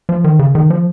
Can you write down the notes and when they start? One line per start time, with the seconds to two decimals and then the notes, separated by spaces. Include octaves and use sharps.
0.09 F3
0.24 D#3
0.39 C#3
0.55 D#3
0.70 F3